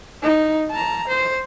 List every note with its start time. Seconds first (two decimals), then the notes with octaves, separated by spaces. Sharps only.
0.23 D#4
0.71 A5 A#5
1.08 C5